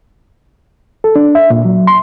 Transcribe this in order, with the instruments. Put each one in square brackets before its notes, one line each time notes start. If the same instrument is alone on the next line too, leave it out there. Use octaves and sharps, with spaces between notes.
[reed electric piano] A4
D4
E5
A#2
F#3
C6